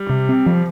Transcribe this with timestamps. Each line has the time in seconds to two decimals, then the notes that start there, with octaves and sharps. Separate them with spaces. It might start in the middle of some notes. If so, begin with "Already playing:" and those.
Already playing: G3
0.09 C3
0.29 C4
0.46 F3